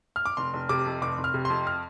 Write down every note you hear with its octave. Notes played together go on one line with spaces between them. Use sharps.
F6
D6
F1 C6
F1
C3 D6
F2
F1 D6
F1
F6
C3
F2 C6
F6